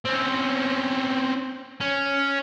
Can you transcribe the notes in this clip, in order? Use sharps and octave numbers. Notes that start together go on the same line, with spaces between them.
C4 C#4
C#4